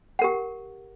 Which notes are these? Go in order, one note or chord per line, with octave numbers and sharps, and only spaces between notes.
G4 A#4 F#5